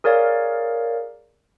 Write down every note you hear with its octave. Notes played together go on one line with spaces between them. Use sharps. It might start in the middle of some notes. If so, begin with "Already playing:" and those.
G#4 A#4 C#5 D5 F5